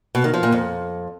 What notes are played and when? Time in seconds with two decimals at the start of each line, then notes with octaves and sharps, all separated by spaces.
0.15 B2
0.24 D#3
0.34 F3
0.43 A#2
0.52 F2